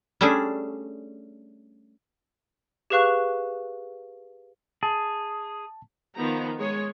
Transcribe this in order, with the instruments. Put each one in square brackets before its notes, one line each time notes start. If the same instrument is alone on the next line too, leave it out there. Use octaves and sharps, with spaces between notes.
[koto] G3 A3 C#4 D4 G#4
[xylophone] G4 G#4 B4 F5 C#6 F#6
[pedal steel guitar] G#4 [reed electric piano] A5
[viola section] D#3 F3 B3 A#5
G#3 C#5